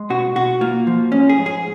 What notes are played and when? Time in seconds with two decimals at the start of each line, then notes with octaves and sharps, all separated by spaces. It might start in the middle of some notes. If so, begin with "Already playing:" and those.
Already playing: G#3
0.10 B2 F#4
0.36 B2 F#4
0.61 A#3 F4
0.87 F3
1.12 G#2 C#4
1.29 G#4
1.37 G#2
1.46 G#4